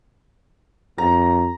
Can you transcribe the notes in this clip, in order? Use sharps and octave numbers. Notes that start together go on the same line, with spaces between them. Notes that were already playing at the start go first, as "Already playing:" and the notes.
F2 A#5